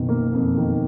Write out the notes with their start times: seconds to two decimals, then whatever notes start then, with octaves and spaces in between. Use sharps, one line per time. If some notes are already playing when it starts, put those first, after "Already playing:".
Already playing: F#1 B2 D#3
0.09 A#3
0.33 F2
0.57 D#3